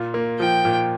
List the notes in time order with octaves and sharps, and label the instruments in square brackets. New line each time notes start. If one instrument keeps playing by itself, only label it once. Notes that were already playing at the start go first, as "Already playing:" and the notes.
Already playing: [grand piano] A#2 F4
A#3
[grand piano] F3 [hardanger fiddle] G5
[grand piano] A#2